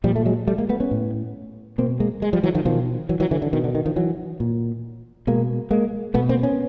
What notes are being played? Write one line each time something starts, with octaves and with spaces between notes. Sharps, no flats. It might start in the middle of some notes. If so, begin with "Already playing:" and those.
A#2 F3 G3
A3
F#3 G#3
G3 A3
G#3 A#3
A3 B3
B3 C#4
A2
B2 A#3 C4
G#3 A#3
G#3
F3 G3
E3 F#3
D#3 F3
B2 D#3 F3
E3 F#3
E3 F#3
D3 E3
D3
B2 D#3
D3
D#3
D#3 F3
E3 F#3
A#2
B2 G#3 A#3
G#3 A#3
B2 A3 B3
A#3 C4
B3 C#4